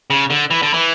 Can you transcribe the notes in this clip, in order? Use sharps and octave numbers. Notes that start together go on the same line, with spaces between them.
C#3
D3
E3
D3
E3